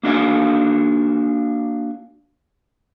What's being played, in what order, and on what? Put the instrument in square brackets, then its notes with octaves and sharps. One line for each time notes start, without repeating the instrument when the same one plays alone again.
[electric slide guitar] A#3 D4 F#4 E5 F5 G#5